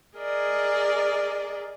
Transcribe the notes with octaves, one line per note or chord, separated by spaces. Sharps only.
G#4 A#4 D5 D#5